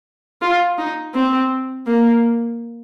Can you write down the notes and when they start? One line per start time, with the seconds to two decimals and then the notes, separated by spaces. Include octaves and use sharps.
0.41 F4
0.78 D#4
1.14 C4
1.87 A#3